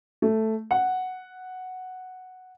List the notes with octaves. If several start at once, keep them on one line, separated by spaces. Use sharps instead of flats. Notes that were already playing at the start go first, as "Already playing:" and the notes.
A3
F#5